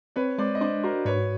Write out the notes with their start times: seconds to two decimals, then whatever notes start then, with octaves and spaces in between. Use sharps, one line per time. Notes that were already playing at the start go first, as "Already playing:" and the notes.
0.16 C4 B4 C#5
0.38 G#3 C5 D5
0.55 D#5
0.61 D4 C5 D5
0.84 F#4 A#4 C5
1.05 G#2 B4 C#5